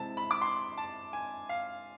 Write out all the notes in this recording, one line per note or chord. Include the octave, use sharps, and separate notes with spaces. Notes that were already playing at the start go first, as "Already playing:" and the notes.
Already playing: C3 G#3 C4 E4 A5
B5
D6
C6
A5
G#5
F5